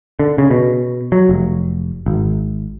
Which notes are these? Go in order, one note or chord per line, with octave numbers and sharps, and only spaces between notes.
D3
C#3
B2
F#3
F1
G#1